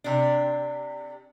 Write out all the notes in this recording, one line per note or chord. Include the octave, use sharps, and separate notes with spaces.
C3 D4